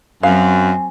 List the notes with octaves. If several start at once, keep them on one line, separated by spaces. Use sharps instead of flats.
F#2 F#3 C4 F5 G#5